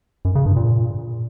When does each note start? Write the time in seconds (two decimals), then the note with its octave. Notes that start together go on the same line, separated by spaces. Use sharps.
0.25 F#2
0.35 C#3
0.46 G2
0.56 A#2